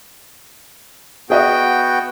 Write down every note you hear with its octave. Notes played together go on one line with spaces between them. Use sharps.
B3 F#4 G#4 D#5 E5 G5